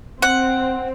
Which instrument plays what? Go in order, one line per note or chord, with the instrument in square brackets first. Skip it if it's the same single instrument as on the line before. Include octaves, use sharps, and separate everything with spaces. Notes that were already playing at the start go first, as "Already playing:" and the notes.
[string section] C4 [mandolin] F#5